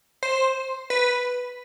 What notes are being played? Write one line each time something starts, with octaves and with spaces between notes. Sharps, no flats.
C5
B4